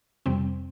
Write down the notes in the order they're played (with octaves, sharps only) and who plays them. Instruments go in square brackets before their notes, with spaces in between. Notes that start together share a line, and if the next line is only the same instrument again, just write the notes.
[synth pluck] F2 C3 G3 C4